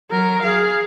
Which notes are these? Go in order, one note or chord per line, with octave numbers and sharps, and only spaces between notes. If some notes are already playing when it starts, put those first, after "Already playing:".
F#3 A#4
G#4 F5